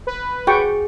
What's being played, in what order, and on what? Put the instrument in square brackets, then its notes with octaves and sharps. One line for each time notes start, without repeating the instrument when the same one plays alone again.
[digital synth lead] B4
[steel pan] F#4 G5 C#6 [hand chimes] G#4